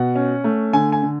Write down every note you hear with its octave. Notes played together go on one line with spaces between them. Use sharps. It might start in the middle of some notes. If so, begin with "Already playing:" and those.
Already playing: B2 F#5
C#4
A3
D3 G#5
G#5
D3